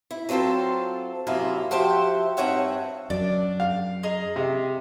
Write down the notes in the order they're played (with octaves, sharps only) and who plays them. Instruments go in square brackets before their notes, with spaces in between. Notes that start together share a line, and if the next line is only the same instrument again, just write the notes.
[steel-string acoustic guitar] E4
F#3 C4 F4 A4 C5
F#2 C3 A#3 E4 F4
F3 F#4 G4 C5 E5
G2 C4 D#4 C#5 E5 F#5
[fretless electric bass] F#2 [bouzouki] D4 D5
[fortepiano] F5
[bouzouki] G#4 D#5 A#5
[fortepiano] C3